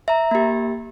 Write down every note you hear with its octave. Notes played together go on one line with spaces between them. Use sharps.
E5 A#5
A#3 G4